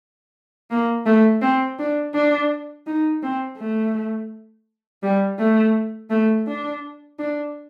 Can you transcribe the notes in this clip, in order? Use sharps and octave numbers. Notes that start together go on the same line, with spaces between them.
A#3
A3
C4
D4
D4
D#4
C4
A3
G3
A3
A3
D4
D4